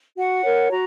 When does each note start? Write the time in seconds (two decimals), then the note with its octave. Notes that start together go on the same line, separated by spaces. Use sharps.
0.16 F#4 F#5
0.43 A#4 C#5
0.71 F#4 A#5